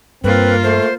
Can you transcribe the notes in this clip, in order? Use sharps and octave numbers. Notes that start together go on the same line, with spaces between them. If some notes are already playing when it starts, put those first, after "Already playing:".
G2 A#3 C4 F4 B4
A3 C5